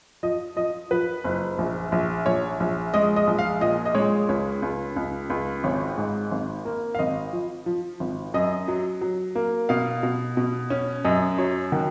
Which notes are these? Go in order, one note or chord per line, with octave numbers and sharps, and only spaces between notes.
F3 D#5
F3 D#5
F3 B4
F#1
A#1
A#1
A#1 C#5
A#1
G#3 D#5
D#5
A#1
F5
A#2 D#5
D#5
G#3 C#5
C#2 C#5
C#2
C#2
C#2
G#1 C#5
G#2
G#1
A#3
F5
G#1 D#5
F3
F3
G#1
F#2 D#5
F#3
F#3
A#3
B2 F5
B2
B2
C#4
F#2 D#5
F#3 C#5
D#3 F#4